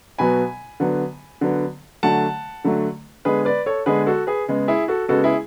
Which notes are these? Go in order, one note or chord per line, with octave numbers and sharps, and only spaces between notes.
B2 F#3 B3 G#5 B5
D3 F#3 B3
D3 F#3 B3
D3 F#3 A3 F#5 A5
D3 F#3 A3
D3 G#3 B3 G#4 B4
B4 D5
A4 C#5
D3 G#3 B3 G#4 B4
F#4 A4
G#4 B4
C#3 G#3 B3
E4 G#4
F#4 A4
C#3 G#3 B3 F#4 A4
E4 G#4